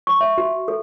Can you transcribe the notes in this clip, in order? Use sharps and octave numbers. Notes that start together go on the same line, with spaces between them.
C#6
E5
F#4
A4